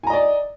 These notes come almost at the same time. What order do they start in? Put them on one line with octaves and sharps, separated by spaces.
G#5 A#5 D#5 D5